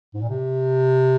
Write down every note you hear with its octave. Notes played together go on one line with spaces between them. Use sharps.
G#2
A#2
C3